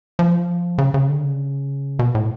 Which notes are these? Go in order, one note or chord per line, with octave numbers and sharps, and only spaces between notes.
F3
C#3
C#3
D3
C#3
B2
A2